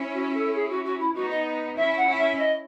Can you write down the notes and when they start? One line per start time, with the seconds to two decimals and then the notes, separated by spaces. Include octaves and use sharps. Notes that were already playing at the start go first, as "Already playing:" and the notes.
Already playing: C#4 E4
0.14 F#4
0.34 A4
0.55 G#4
0.70 F#4
0.85 F#4
1.00 E4
1.15 B3 D#4 F#4
1.31 D#5
1.77 C#4 E4 E5
1.97 F#5
2.07 C#4 E4
2.18 E5
2.37 D#5